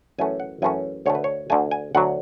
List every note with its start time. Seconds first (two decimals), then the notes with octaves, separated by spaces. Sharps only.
0.19 F#2 E3 A3 C#4 G#5
0.40 F#5
0.62 F#2 E3 A3 C#4 G#5
1.06 D2 D3 A3 C#5
1.15 B4
1.24 C#5
1.50 D2 D3 A3 G#5
1.71 G#5
1.95 D2 D3 F#3 F#5